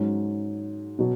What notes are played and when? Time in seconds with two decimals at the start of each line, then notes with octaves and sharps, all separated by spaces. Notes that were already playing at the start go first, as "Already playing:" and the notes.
Already playing: G#2 F#3 C#4
0.99 B2 F#3